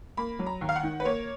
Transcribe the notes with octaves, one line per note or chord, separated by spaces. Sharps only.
A#3 B5
F#3
A#5
D#2
F5
F#5
D#3
B4
A#3 C#5